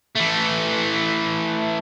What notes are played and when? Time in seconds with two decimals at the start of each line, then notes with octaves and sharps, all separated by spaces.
0.16 E3 A3